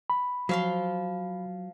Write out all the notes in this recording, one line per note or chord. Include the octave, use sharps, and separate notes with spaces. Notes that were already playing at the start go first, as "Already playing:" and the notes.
B5
F3 F#3 F5 C6